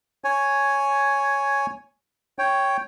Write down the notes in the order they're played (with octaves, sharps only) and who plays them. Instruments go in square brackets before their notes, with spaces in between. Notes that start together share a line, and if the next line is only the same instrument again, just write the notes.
[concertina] C#5 G#5
C#5 G5